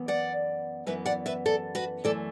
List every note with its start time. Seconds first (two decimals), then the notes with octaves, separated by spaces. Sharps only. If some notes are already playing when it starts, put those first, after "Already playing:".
Already playing: F#2 E3 B3
0.08 D5 F#5
0.86 F#2 E3 B3 B4 E5
1.06 D5 F#5
1.26 B4 E5
1.46 A4 D5
1.75 F#4 B4
2.04 F#2 E3 A3 A4 D5